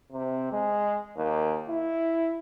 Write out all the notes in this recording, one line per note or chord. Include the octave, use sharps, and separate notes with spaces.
C3
G#3
D#2
E4